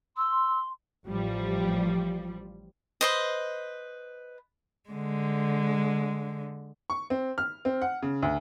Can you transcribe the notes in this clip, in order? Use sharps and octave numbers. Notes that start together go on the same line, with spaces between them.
C6 E6
A1 F3 G3
B4 C5 D#5
D3 G#3
C#6
C4
F6
C4
F#5
C#3
D2